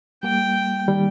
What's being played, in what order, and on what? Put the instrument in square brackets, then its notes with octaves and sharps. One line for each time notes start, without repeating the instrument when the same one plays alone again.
[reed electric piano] G3 A#3 [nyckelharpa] G5
[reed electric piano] D#3 G3